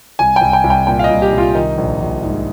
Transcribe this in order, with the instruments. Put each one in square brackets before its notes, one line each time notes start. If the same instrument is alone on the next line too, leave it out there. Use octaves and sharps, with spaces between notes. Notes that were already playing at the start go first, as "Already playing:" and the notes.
[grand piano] C2 G#5
G5
C2
G5
C2
G5
A#2 G5
F5
D#5
C2
G4
C2 F4
D#3 D#4
A#1
A#1
G#2